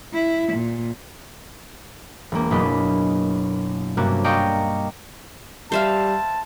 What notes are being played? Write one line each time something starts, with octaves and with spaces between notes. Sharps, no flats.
E4
A#2
E1 A#3
F#1 B2 D4 D#5 B5
G2 C3 A#3 C#4 D4 F#4
D5 D#5 F5 G5 A#5 C#6
G3 C5 E5 F5 A5